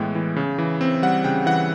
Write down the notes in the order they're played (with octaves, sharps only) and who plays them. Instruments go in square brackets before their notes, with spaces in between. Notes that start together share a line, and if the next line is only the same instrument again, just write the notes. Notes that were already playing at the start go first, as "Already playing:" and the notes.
Already playing: [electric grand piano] A2 E3 G#3 B3 G5
E3
C#3
E3
C4
G3 F#5
C#3 G5
E3 F#5